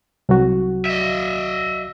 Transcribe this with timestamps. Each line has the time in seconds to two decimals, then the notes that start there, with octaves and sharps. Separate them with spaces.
0.29 C2 F#3 F#4
0.86 D#5 E5